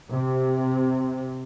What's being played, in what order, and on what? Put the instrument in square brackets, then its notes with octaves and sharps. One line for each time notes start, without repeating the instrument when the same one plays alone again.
[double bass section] C3